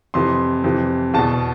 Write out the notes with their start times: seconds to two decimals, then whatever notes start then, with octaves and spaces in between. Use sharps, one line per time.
0.14 F2 C3 E3 C6
0.64 F2 C3 E3
1.14 E2 B2 A5